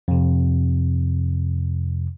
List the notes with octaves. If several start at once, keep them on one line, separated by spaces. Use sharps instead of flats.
F2 C3